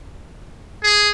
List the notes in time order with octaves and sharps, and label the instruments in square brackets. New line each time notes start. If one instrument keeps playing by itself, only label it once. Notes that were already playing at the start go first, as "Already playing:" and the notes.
[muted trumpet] G#4